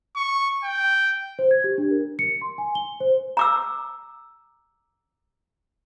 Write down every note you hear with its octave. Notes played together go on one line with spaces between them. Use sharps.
C#6
G5
C5
G#6
G4
D4
A#4
C#7
C6
G#5
G7
C5
A#5 D6 E6